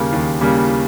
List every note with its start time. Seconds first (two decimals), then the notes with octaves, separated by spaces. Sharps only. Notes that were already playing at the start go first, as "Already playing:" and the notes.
Already playing: D#2 C#3 G3 A#3
0.13 D#2
0.41 C#3 G3 A#3